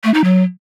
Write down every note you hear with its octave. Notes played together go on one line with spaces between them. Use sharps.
A3
D#4
F#3